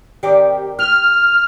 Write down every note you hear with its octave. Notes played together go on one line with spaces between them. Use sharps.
D#3 C4 G4 D5
G4 F6